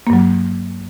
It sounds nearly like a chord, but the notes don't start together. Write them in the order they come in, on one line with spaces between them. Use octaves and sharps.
A#3 G2 F#3